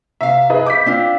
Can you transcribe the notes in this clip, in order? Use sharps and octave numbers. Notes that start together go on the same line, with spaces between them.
C3 E5 F5
G#4 B4 D#5
D6 G6 B6
C4 D4 F4